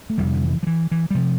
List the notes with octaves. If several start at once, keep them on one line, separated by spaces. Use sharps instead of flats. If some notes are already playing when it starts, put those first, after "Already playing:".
A3
F1 F2 C3 G3
D3
E3
F3
E3
E3
G3
C3 F3